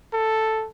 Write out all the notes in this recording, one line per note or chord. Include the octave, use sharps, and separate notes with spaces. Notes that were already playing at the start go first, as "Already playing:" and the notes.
A4